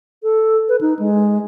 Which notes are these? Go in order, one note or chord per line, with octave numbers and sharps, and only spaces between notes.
A4
B4
D#4
G#3